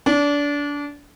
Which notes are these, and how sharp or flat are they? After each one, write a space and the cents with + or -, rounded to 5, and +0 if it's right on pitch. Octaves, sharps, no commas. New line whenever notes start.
D4 -25